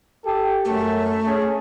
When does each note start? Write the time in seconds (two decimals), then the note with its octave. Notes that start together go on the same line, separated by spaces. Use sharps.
0.24 G4 A4
0.65 F#2 A3
1.25 C#4 G#4